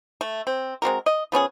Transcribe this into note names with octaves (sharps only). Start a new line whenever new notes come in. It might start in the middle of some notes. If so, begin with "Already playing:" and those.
A3
C4
G#3 C4 F#4 A#4
D#5
F3 B3 C#4 G#4